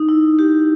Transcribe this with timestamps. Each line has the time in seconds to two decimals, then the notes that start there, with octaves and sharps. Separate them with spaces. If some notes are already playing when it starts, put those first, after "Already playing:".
Already playing: D#4
0.09 E4
0.39 G4